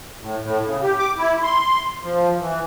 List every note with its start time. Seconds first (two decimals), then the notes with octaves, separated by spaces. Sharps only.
0.22 A2
0.44 A2
0.65 C#3
0.82 G4
0.99 D6
1.18 E4
1.43 C6
2.04 F3
2.40 E3